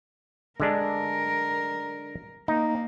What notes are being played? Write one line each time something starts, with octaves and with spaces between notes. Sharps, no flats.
D3 G#3 D4 A#4
A#3 D#4